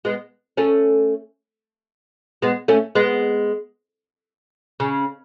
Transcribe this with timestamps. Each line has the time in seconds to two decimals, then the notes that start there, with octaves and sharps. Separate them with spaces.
0.05 G#3 B3
0.57 A3 C#4
2.42 G#3 B3
2.68 A3 C#4
2.95 G#3 B3
4.80 C#3